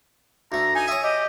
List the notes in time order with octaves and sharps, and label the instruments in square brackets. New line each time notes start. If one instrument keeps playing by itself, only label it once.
[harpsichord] D2 A3 [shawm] A#5
[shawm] D#4 [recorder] G#5
[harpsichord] C#5 E5 [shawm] D#6
[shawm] G4 [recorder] D#5